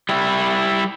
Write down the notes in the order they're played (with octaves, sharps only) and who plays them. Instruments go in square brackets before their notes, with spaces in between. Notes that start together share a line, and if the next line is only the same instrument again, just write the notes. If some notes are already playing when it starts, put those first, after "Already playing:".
[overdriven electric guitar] G3 E4